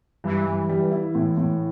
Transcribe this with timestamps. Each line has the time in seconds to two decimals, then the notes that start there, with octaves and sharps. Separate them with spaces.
0.24 G2 E3
0.47 G2
0.69 G3
0.91 E4
1.15 A2
1.37 A2